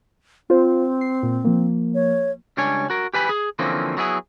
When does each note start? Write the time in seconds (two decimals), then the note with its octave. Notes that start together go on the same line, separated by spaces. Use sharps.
0.50 C4 F4 C5
1.01 C7
1.23 A#2
1.45 F3 A#3
1.95 C#5
2.57 C#2 G3 D4 C#5 G#5
2.90 F#4 A#4
3.14 G4 B4 G#5 B5
3.29 G#4
3.59 D3 E3 F3 A#3 C4 C#4
3.97 F#3 B3 E4 G#4